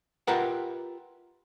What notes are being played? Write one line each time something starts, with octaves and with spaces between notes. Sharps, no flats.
F4 G4 A#4 B4 E5 F#5